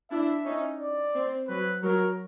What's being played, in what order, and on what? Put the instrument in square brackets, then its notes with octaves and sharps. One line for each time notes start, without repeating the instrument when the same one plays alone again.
[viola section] D4 E4 [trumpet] E5
[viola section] C#4 D#4
[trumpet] D5
[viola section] C4
[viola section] F#3 [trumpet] B4
[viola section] F#3 [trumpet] A#4